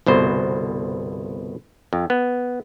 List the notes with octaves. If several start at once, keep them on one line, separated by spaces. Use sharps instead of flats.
G1 C2 B2 C5
F2
B3